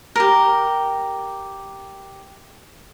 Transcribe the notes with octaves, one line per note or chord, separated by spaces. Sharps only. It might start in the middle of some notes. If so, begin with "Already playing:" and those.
G4 A#4